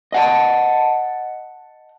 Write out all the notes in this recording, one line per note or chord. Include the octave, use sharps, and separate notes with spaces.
D#5 F#5 A5